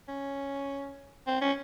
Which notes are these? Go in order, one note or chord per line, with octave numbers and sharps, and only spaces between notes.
C#4
C4
C#4